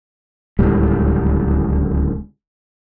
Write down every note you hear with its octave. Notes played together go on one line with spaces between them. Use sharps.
D1 C#2 A2 G3